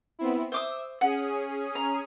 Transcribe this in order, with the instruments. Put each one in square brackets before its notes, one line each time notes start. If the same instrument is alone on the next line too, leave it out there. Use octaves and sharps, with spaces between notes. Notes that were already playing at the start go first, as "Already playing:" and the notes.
[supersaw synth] B3 C4 E4
[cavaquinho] C5 D6 D#6 [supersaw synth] E5
[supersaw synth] C#4 G#4 D#6 [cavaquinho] F#5
[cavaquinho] A#5